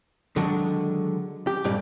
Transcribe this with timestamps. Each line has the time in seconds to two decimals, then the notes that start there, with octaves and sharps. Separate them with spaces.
0.36 D3 D#3 F#3 G#3 D4 F#4
1.47 G4
1.64 G2 A#2 G3 A#3 D5